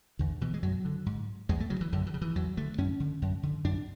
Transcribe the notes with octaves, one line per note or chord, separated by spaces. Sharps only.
E2 D3
B2 E3
G#3
F#2 F#3
D3
G#2
E2 G#3
A3
C#3 F#3
E3
F#2 D3
E3
C#3
E3
E2 F#3
D3 A3
F#2 C#4
D3
F#2
D3
F#2 D4